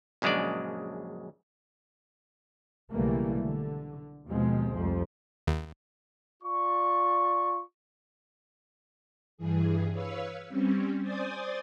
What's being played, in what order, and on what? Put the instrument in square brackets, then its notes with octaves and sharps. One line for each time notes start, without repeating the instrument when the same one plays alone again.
[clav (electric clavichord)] A#1 F#2 C#3 G#3 D4 D5
[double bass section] B1 C#3 E3 G3 A3 A#3
D3
D#2 B2 F3 G#3 C4
C2 F2 F3
[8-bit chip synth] D#2
[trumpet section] F4 D5 C#6
[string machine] G2 E3 G#4
B4 C#5 F5 E6
G3 C4 C#4
C5 D5 G#5 D#6 G6 A6